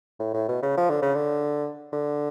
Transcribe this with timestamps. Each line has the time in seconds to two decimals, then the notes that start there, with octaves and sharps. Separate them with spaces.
0.20 A2
0.34 A2
0.49 B2
0.63 C#3
0.78 F3
0.90 D3
1.02 C#3
1.15 D3
1.93 D3